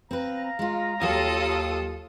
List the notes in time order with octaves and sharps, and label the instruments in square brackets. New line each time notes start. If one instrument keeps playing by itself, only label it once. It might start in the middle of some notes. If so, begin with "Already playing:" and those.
[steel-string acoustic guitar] C4 B4 [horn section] F5 A#5
[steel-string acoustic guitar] G#3 F4
[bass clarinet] D#2 [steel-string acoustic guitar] F#3 G4 [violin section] F4 A4 D#6